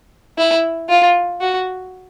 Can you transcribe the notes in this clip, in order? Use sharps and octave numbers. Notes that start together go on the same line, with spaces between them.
E4
F4
F#4